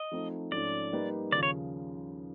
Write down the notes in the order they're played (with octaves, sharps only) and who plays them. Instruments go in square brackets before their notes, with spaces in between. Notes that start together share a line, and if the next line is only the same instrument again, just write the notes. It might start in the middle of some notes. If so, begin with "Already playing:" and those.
Already playing: [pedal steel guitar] D#5
[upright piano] F3 A3 C4 D#4
[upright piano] G#2 F3 A3 C#4 [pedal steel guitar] D5
[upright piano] G3 A#3 D#4 G4 B4
[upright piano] D#2 C#3 F3 [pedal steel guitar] D5
[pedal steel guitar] C#5